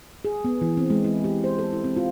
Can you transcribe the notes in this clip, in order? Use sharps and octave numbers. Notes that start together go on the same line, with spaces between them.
G#4
B3
E3
C4
G#3
E4
G4
C5
A4
E4
C4
F4